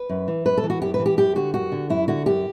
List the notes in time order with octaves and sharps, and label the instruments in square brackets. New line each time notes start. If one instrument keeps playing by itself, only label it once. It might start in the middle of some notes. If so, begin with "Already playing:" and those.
Already playing: [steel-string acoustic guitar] B4
F#2
E3
F#2 B4
A4
E3
F#4
F#2 G4
B4
E3
G4
F#2 G4
D3 F#4
F#2 F#4
D3
F#2 E4
D3 F#4
F#2 G4